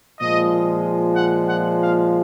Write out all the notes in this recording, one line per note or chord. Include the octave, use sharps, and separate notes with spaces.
A#2 F3 G#3 D#5
F#5
F#5
F5